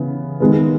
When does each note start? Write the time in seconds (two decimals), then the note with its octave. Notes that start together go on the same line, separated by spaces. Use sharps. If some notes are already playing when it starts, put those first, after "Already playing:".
Already playing: C#3 E3 B3
0.40 D#3 G#3 B3